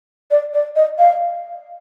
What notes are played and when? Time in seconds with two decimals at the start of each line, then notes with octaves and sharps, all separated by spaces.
0.31 D5
0.54 D5
0.76 D#5
0.98 F5